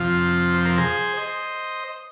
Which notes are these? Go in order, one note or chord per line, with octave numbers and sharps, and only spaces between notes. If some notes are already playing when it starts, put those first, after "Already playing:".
Already playing: F2 C3 F3 F4
C5
A#4
G#4 C5
C5 D#5